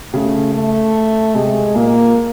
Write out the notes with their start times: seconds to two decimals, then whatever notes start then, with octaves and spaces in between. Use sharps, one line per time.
0.13 C#3 A3
0.54 A3
1.35 C3 G#3
1.75 A#2 A#3